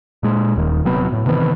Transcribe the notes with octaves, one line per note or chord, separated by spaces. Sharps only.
A#2 G#3
D#1 D#2 D#3
D#1 C3 F#3 B3
A2
C3 D#3 E3 B3